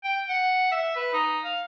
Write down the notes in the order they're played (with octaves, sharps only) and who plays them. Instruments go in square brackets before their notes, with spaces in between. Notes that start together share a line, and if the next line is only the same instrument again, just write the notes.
[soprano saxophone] G5
F#5
E5
B4
D#4
F5